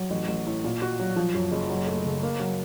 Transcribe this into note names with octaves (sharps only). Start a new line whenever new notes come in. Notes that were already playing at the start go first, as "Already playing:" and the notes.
Already playing: F#3
A1
A1
A2
A#2
F#4
F#3
F3
F#2
F#1
F#3
A3
C#3
A#3
F#3